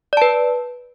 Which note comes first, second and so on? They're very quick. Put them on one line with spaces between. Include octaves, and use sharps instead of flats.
D5 A5 B4